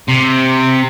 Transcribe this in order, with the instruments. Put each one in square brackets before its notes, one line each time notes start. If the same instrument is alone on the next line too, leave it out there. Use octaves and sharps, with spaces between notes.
[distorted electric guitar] C3